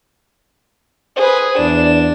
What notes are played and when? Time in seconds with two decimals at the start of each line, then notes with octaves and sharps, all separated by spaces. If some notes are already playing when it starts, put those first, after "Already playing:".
1.17 G#4 B4 C5
1.59 E2 D4 E7